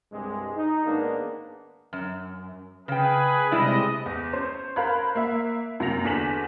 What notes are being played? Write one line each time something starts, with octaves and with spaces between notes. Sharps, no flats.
C2 G2 C3 G#3
D#4
G#2 D#3 G#3 A#3 B3 D4
F#2
C#3 G#4 B4 G5
C3 G3 G#3 E4 D5 D#5
E2
C#4 C5
A#4 C5 F5 B5 F#6 G#6
A#3 E5
F#2 C3 A#3 A#6 F7
E2 D3 G#5 B6 E7 F#7